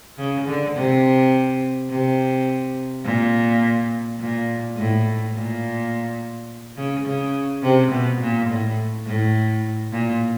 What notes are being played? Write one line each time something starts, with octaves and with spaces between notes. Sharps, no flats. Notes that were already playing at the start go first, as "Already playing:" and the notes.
C#3
D3
C3
C3
A#2
A#2
A2
A#2
C#3
C#3
C3
B2
A#2
A2
A2
A#2